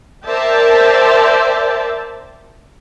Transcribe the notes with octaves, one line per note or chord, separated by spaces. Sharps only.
A#4 C5 D5 E5 G5 A5